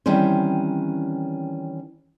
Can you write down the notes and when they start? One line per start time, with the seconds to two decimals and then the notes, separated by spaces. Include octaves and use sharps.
0.06 D#3 E3 G3 C4 C#4 C5